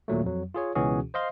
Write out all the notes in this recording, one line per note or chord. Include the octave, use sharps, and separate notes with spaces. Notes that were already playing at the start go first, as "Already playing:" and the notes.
D#2 A#2 F#3 A3
F2 F#3
F4 G#4 C#5
C#2 B2 E3 C#4 F#4 G#4
C5 D#5 F5 C6